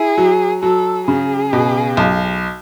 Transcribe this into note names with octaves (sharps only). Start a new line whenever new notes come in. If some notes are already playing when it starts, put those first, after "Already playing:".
Already playing: E4 G#4
F#3
F#3 A4
C#3 G#4
B2
B1